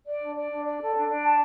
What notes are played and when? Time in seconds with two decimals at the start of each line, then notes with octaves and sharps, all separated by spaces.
0.06 D5
0.21 D4
0.36 D5
0.50 D4
0.64 D5
0.80 A4
0.94 D4
1.08 D4
1.23 A5